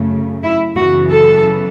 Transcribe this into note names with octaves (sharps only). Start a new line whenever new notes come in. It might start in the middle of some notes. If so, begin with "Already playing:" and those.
Already playing: F#2 C#3 A3
E4
F#2 C#3 E3 B3 F#4
A4